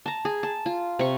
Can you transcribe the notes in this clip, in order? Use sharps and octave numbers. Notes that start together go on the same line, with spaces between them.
A5 A#5
G#4
A5
F4
C3 C#6